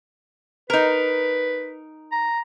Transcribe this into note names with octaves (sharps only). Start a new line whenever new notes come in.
D#4 A#4 B4
A#5